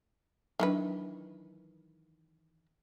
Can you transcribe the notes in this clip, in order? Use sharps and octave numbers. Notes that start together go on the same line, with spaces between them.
D#3 E3 F#3 D4 B4